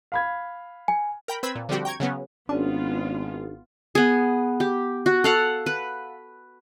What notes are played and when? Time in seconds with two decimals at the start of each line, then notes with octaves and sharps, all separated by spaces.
0.12 F5 B5 G#6
0.88 G#5
1.28 A#4 G5 B5
1.43 C4 B4 B5 E6 G#6
1.55 A#2
1.69 D3 F3 G3 C4 F#4 G4
1.85 G5 A#5 C#6 G#6
2.00 C#3 F#3 B3 C#4
2.49 G#1 B3 C#4 D4 F4
3.95 B3 G#4
4.60 G4
5.06 F#4
5.24 A4 F5 F#5
5.66 B4